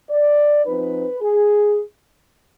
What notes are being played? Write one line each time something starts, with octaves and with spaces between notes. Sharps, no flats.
D5
F3 C4 D#4 B4
G#4